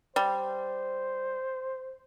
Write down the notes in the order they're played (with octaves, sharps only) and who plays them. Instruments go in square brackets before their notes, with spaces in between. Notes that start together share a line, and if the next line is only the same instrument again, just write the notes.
[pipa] G3 [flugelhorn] C5